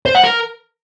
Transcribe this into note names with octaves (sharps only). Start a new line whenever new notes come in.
C5
F#5
A#4